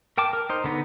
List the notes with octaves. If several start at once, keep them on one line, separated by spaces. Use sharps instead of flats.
A#4 G5 A5 D6
A#4
D#4 C5
D3 B3 D#4